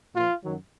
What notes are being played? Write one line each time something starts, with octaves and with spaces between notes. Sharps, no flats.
A#2 F3 F4
F#2 D#3 F#3